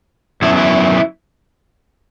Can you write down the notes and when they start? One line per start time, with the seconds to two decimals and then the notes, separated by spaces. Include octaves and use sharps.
0.42 F#2 F#3 B3 E4
0.57 E4